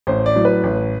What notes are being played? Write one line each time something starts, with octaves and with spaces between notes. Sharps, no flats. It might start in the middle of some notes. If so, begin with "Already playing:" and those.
A1 C5
D5
A2 F#3
B4
A1